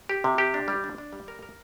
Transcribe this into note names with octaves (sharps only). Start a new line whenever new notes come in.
G4
C3
G4
D4
G3
D4
D4
G3
A#4
A#4